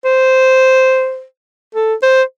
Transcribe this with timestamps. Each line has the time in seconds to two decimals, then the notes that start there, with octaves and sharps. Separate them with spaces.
0.04 C5
1.74 A4
2.02 C5